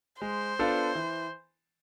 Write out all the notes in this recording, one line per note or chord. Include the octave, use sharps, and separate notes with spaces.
G#3 C5
B3 D4 F4 A4
E3